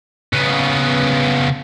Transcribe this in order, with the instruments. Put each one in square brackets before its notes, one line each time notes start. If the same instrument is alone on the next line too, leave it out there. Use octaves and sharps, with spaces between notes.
[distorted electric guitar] C#3 B3